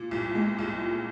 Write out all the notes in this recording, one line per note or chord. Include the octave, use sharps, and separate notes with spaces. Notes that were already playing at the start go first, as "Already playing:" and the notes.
Already playing: A#2
C2
G#3
C2
A#2